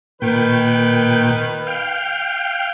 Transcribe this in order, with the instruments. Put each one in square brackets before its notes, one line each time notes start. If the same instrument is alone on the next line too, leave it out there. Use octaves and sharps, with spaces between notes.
[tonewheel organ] A#2 G5 [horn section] D#3 B4
[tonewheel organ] F5 G5